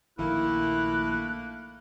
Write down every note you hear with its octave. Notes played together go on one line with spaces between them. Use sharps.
A#1 D#3 A3 A#3 E4 F#6